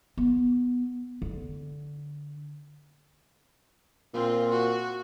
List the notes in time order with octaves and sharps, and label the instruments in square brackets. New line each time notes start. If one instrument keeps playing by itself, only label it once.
[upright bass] B3
D3
[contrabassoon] A#2 [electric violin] C4 F4
[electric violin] F#4